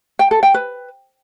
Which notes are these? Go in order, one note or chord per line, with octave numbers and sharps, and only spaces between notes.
G5
A4
G5
B4